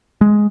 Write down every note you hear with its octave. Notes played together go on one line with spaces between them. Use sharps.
G#3